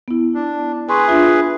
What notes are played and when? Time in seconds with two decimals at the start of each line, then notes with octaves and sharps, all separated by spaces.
0.08 B3 E4
0.35 D4
0.89 G#4 B4 G#5 C6 C#6
1.08 D4 F4 E5